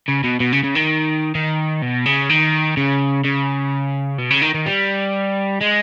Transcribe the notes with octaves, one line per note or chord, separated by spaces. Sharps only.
C#3
B2
B2
C#3
C#3
D#3
D#3
B2
C#3
D#3
C#3
C#3
B2
C#3
D#3
D#3
G3
G#3